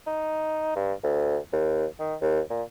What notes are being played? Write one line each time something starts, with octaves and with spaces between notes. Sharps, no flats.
D#4
G2
D2
D#2
D#3
D#2
A#2